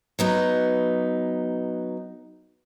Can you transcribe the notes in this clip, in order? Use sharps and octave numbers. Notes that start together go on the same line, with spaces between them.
F#3 B3 D#4